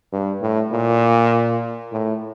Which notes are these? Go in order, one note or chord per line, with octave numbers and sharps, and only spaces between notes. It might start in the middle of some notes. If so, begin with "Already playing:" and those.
G2
A2
A#2
A2